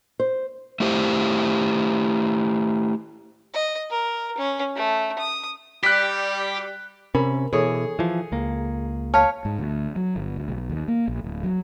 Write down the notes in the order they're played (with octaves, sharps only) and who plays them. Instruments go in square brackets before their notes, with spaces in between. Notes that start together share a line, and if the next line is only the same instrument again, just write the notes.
[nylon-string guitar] C5
[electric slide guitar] A3 E4 G4 C5
[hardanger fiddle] D#5
A#4
C#4
A3
D#6
[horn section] G3 [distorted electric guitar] G4 [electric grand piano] F#6 B6
[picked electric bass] C3 C#4 [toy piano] A#4 [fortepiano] B5
[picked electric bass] B2 E3 [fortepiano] G#4 C#5 [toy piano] A4
[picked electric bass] E3 F3
C#2 A#3
[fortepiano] C#5 F6 [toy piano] F5 A5
[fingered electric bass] G#2
D2
F#3
G1
D2
B1
D#2
A#3
A#1
D1
F#3